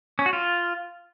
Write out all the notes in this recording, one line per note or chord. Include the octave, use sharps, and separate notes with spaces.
C#4
F#4
F4